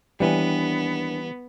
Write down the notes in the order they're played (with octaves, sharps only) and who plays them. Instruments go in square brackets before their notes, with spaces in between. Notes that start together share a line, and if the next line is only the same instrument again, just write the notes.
[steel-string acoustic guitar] D#2 D4 G#5 [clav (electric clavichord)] E3 G3 [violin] B3